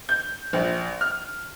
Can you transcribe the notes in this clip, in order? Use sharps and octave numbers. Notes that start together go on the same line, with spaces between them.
G6
A#1
F6